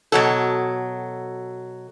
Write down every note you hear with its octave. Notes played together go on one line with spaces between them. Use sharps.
B2 F#3 A4